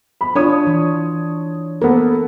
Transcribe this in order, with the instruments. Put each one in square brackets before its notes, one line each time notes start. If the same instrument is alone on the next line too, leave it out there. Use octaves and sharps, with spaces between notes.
[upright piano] B5
[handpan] D4 F4 [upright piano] C#5 D#6
[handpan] E3
[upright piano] A#3 B3 [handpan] A4